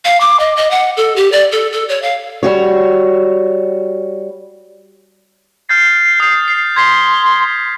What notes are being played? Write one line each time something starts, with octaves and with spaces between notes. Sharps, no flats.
F5
D6
D#5
D#5
F#5
A4
G4
D5
A4
A4
C#5
F5
G3 F#4 C#5
F6 G6 A6 C7
D#6 G6
C7
C6 G#6 B6 C7